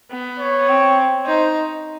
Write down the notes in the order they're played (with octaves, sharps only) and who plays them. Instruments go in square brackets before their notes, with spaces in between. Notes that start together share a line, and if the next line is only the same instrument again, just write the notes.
[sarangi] B3
[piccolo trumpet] C#5
[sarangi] C4
[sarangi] D#4 [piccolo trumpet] C5